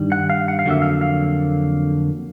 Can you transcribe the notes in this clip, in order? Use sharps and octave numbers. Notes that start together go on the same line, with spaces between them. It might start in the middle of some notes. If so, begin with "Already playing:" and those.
Already playing: G2 D#3 G3
F#5
F5
F#5
F5
F2 D3 F#3 A#3 E5
F5
F5